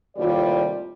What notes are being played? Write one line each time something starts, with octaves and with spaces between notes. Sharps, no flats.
D#2 A2 C3 G3 F4 D5